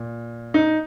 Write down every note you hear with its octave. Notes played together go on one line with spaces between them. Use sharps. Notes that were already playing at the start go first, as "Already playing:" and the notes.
Already playing: A#2
D#4